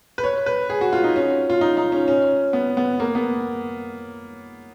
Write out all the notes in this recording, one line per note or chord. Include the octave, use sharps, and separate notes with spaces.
B4
C#5
B4
G#4
F#4
F4
D#4
C#4
F4
D#4
D#4
C#4
C#4
B3
B3
A#3
B3